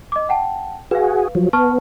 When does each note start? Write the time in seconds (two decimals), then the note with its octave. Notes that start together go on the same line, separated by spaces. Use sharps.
0.12 D#5 D6
0.29 F#5 G5 A5
0.91 F#4 G#4 B4 F5
1.35 F3 F#3
1.53 B3 A5 C#6 F6